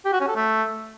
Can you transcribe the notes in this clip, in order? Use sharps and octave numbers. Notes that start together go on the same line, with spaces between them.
G4
F#4
C#4
A4
A3